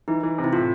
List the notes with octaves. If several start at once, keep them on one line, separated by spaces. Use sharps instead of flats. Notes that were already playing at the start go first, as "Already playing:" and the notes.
E3 D#4
E3
C3
E4
A2 F4